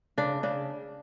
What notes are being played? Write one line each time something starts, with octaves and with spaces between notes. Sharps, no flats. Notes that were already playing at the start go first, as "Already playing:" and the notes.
C#3 D4
C#3 D4